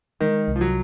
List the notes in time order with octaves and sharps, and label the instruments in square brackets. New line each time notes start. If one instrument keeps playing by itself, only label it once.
[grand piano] D#3 [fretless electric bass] G#3
[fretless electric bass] C2
[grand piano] F3
F#3